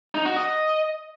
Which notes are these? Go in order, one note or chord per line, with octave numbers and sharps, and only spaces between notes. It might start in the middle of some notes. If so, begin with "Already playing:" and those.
D#4
F#4
D#5